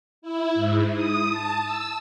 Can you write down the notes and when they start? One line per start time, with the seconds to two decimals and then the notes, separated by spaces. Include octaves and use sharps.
0.22 E4
0.54 G#2
0.94 D#6
1.29 A5
1.64 E6